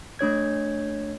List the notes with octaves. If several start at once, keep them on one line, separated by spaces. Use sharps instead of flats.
A3 D4 C#5 G#6